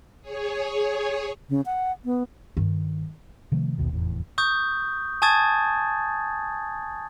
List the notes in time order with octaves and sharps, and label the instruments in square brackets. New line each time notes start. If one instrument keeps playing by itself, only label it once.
[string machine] G#4 C#5
[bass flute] C#3
F#5
B3
[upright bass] G2 D#3
[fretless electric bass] C3 D#3 F3 A3
A#1 D#2 B2 D#3
F1 E2 A2
[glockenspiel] C#6 D#6 G6
G#5 A5 C#6 D#6 G#6 A6